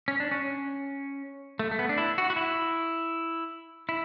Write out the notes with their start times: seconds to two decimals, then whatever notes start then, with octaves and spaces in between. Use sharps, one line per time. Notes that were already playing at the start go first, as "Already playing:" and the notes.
0.08 C#4
0.20 D4
0.31 C#4
1.59 A3
1.71 A3
1.79 B3
1.89 D4
1.98 E4
2.18 F#4
2.30 F#4
2.36 E4
3.89 E4